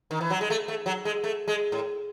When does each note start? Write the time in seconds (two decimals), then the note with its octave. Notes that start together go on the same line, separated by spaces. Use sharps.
0.11 D#3
0.21 E3
0.31 F#3
0.41 G#3
0.50 A3
0.68 A3
0.86 F#3
1.05 G#3
1.24 A3
1.48 G#3
1.72 A2